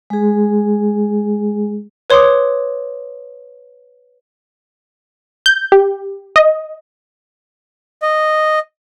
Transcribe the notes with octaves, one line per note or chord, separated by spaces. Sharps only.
G#3 G#4
B4 C#5 C6 D6 D#6
G6
G4
D#5
D#5